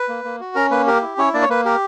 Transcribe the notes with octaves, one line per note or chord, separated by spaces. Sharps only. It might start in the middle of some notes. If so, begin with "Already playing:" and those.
Already playing: B4
A#3
A#3
F#4
C#4 A#4 A#5
A#3 B4
G4 A#4
E4
C#4 E4 C#5
A#3 D4 D5
C#5
A#3 B4
G4 A#4